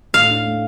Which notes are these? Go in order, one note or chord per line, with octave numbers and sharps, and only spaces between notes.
A2 F5
D4
A3